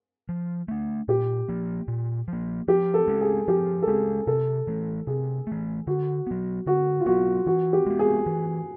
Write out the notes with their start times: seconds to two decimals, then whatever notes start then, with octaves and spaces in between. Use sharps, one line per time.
0.29 F3
0.68 A3 D4
1.08 A#2 G4
1.49 F3 A#3
1.88 A#2
2.28 F3
2.33 A#3
2.68 F3 G4
2.94 A4
3.08 G#3 C#4
3.21 G#4
3.48 F3 G4
3.82 A4
3.87 G#3 C#4 G#4
4.27 C3 A4
4.67 E3 A3
5.07 C3 G#4
5.47 E3 A3
5.87 D3 F#4
6.27 F#3 B3
6.66 D3 F#4
7.00 F4
7.06 F#3 B3 F#4
7.46 E3 F#4
7.73 G4
7.86 G#3 B3
7.99 G#4
8.26 E3